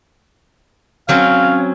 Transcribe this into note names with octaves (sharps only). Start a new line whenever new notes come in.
F#3 C4 C#4 F5